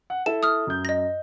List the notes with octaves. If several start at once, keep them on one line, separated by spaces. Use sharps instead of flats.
F#5
E4 A4 E7
D#6 F6
F#2 G6
D#5 A#6